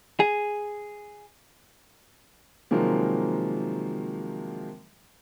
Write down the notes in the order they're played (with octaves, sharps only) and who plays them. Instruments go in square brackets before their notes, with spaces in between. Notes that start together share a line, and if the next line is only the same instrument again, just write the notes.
[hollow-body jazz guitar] G#4
[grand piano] C3 D#3 F3 F#3 G#3 A#3